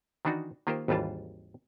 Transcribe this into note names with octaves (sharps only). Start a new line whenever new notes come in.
D#3 E3 D4 D#4 F#4
D#3 A#3 F4 G4 A#4 C5
G#1 D#2 E3 G3 F4 A5